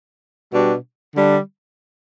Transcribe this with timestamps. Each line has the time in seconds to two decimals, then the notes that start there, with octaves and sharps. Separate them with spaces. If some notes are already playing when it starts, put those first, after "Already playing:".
0.52 B2 G3 D4 F#4
1.14 D3 G3 D4